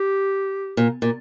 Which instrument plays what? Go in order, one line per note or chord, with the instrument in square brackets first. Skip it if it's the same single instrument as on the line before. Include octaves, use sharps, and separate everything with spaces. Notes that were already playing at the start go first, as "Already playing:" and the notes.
Already playing: [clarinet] G4
[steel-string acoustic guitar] A#2
A#2